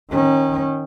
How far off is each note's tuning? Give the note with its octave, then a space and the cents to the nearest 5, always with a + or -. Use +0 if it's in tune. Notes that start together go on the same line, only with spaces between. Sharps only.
D#3 +0 C#4 -30